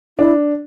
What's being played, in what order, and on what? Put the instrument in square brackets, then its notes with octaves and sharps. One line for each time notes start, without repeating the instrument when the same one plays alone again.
[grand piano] D4 [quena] E4